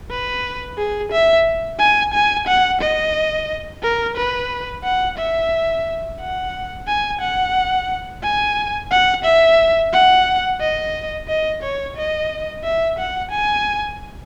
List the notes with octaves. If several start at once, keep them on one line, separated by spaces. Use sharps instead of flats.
B4
G#4
E5
G#5
G#5
F#5
D#5
A#4
B4
F#5
E5
F#5
G#5
F#5
G#5
F#5
E5
F#5
D#5
D#5
C#5
D#5
E5
F#5
G#5